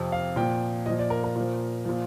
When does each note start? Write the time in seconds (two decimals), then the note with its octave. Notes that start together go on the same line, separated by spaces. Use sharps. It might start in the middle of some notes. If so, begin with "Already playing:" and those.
Already playing: F2 C3 F3
0.12 F5
0.36 A#2 F3 G5
0.86 A#2 F3 D#5
0.99 D5
1.10 A#4
1.24 A#4
1.36 A#2 F3
1.85 A#2 F3